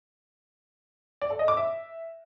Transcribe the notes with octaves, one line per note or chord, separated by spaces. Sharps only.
D5
A4
D#5
D6
E5